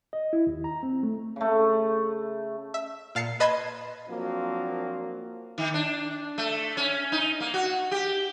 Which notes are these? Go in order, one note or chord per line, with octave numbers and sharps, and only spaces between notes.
D#5
E4
D#2
A#5
C4
A3
C#3 A3
E5
A#2 F5 A5 C7 C#7
B4 D#5 A5 B5 C6 G#6
F3 F#3 A#3 C4 D4 F#4
D#3
D4
A3
C#4
D#4
A#3
F#4
G4